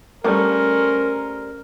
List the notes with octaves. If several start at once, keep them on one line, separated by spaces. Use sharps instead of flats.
G3 A3 A#3 C#4 A#4 C5